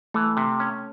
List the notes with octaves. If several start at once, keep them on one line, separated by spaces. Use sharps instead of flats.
E3 A3
C3
C#4